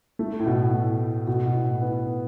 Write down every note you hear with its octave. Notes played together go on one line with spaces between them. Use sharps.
A3
A2
B2
A2
B2
B2
A2
B3